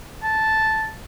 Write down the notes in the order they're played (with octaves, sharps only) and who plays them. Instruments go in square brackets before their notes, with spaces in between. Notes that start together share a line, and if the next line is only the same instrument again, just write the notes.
[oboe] A5